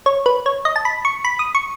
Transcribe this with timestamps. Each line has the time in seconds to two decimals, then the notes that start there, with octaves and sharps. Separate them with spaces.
0.06 C#5
0.26 B4
0.46 C#5
0.65 D#5
0.76 A5
0.85 B5
1.05 C#6
1.24 B5
1.39 D#6
1.55 C#6